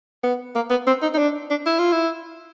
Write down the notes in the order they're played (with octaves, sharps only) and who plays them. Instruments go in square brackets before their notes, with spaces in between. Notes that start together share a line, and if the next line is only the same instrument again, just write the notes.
[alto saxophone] B3
A#3
B3
C4
D#4
D#4
D4
D4
E4
F4
E4